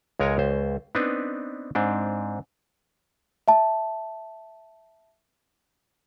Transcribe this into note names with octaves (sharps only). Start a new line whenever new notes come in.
C#2 G#3 A#4 C#5 G#5 A#5
C#2 C5
B3 C4 D4 D#4 B4
G#2 C4 D4
E5 A5